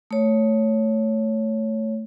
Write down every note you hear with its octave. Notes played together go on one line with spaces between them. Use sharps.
A3 C#5